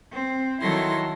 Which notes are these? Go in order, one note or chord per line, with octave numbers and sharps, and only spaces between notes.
C4
D#3 F#3 E4 A4 C6 A#6